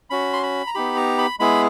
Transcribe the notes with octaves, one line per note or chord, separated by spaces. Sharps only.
C#4 F#4 B5
C6
B5
A#5
B3 D#4 G4 B5
A#5
B5
G#3 B3 E4 G#4 B5